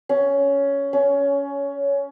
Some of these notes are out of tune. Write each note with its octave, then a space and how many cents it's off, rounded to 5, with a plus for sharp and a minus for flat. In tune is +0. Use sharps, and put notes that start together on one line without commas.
C#4 +10
C#4 +20